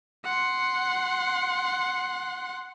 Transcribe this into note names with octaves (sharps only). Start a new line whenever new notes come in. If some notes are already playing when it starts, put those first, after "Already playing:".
F#5 C6